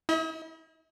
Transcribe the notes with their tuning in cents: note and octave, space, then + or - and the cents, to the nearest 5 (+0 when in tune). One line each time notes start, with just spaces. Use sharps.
E4 -30 D#5 +40